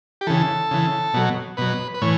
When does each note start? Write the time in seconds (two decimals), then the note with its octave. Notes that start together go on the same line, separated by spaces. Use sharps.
0.21 G4
0.27 C#3 E3 A4
0.71 C#3 E3
1.14 B2 F#3
1.57 B2 F#3 B4
1.94 B4
2.01 A2 E3 C#5